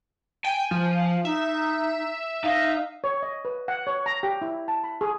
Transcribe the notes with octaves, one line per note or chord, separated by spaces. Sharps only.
G5 G#5
F3
F5
D#4 E5
D#4 F5
C#5
D#5
B4
F#5
C#5
A#5
G4
E4
A5
B5
G#4